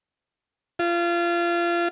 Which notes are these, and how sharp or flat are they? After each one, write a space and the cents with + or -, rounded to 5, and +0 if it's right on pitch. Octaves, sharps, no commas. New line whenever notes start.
F4 -25